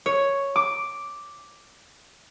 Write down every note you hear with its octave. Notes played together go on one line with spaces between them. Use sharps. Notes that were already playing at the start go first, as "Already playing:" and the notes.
C#5
D6